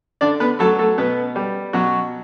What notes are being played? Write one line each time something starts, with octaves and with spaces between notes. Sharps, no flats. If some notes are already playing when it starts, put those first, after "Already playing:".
D3 D4 D5
B3 B4
F#3 A3 A4
A3 A4
B2 B3 B4
G3
B2 F#3 F#4